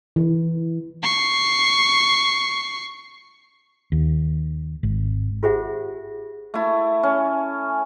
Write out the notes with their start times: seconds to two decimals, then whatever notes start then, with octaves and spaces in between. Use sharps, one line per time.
0.16 E3
1.03 C#6 C7
3.92 D#2
4.83 G#1
5.43 F4 G4 G#4 C5 E5 F#5
6.54 A3 E4
7.03 C#4